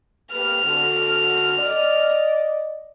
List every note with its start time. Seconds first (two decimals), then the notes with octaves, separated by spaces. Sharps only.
0.32 A#3 G4 B4 F6
0.64 D3 F#4
1.58 D5 D#5